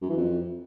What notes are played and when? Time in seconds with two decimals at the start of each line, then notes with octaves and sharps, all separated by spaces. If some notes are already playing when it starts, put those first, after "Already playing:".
0.02 F#2
0.10 E3
0.17 F2